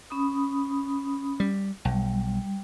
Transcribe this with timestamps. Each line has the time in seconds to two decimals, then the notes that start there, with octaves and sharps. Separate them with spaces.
0.10 C#4 B5 D#6
1.40 G3
1.85 B1 G3